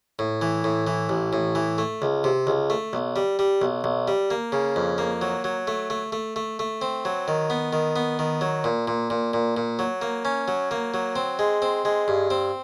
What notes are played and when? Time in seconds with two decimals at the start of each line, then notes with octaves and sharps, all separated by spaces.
0.19 A2
0.42 E3
0.64 A2
0.87 E3
1.09 A1
1.33 A2
1.55 E3
1.78 A3
2.02 C#2
2.24 C3
2.47 C#2
2.70 A3
2.93 B1
3.16 G3
3.39 G3
3.62 B1
3.84 B1
4.08 G3
4.31 A#3
4.52 C#3
4.76 F2
4.98 A#3
5.22 F#3
5.44 F#3
5.67 A3
5.90 A3
6.12 A3
6.36 A3
6.59 A3
6.82 C4
7.05 F#3
7.28 D#3
7.50 B3
7.73 D#3
7.96 B3
8.19 D#3
8.41 F#3
8.64 A#2
8.88 A#2
9.10 A#2
9.33 A#2
9.57 A#2
9.79 F#3
10.02 A#3
10.25 C#4
10.48 F#3
10.71 A#3
10.94 F#3
11.16 C4
11.39 G#3
11.62 C4
11.85 G#3
12.08 G2
12.30 C4